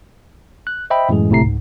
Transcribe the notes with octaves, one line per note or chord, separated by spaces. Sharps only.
F#6
C5 D#5 E5 G5 B5
F#2 A2 E3 G#3 G#4
G1 A2 C3 A3 A#5 C7
C#2 G#2